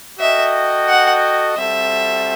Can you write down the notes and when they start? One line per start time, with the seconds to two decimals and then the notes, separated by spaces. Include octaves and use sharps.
0.20 F#4 A4 D#5 E5 G5
0.88 F#5
1.57 G3 C4 F#4 A4 E5